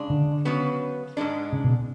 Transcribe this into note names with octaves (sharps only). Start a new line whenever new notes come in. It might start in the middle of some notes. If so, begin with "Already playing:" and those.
Already playing: C#3 G#3 D4
D3
C#3 F#3 B3
G#2 G#3 D4
C#3
B2